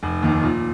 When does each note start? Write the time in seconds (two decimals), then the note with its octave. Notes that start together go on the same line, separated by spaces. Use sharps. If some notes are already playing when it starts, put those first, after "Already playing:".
0.03 F1
0.22 D#2 D#3
0.43 A#2